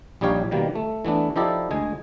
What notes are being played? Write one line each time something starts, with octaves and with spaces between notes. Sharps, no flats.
A#1 G3 D#4 G4 C#5 F5
B2 D#3 G3 A#3
A3
E3 A3 B3 D4
F3 D#4 E4 G4 A4 D5
D2 G#3 G#4 G#5